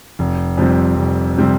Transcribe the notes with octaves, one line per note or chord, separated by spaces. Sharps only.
F1
F2 C3 G3 C4
F1
C3 G3 C4